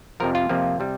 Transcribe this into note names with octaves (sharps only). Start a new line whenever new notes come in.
F2 C3 F3 A#4
F4
F2 C3 F3 A#3
C3 G3